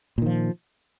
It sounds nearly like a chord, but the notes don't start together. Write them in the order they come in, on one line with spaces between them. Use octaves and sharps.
A#2 D#3 F3